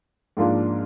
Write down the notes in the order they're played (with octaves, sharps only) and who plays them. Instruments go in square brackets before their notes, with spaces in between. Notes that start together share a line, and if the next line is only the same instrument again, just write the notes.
[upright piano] G#2 F3 A#3 D4 F4